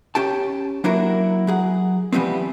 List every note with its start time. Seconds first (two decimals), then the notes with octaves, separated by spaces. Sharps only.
0.15 C#4 G4 G5 A5
0.84 F#3 A#3 D4 E4 F#4 A#4
1.47 F#3 G#4 F#5
2.13 E3 F3 G3 B3 C4